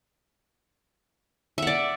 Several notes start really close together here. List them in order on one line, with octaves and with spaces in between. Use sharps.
E5 F#5 D5